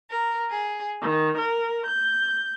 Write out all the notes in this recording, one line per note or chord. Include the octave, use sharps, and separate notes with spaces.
A#4
G#4
D#3
A#4
G6